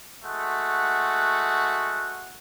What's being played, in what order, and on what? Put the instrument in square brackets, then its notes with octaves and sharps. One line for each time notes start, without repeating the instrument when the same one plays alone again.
[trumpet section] G#3 A3 F#4 F#5